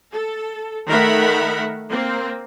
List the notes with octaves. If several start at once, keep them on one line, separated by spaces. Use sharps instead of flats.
A4
D#3 A3 A#4 E5 F#5 B5
A#3 C4